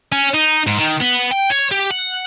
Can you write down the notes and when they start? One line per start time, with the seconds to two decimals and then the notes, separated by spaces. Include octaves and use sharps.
0.12 C#4
0.34 D#4
0.67 G#2
0.78 D#3
1.00 B3
1.31 G5
1.50 C#5
1.71 G4
1.91 F#5